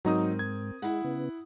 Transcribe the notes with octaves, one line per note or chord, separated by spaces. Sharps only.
G#2 F#3 C4 D#4 A#4 D#6
G#6
G#3 E4 F#5
C#3 B3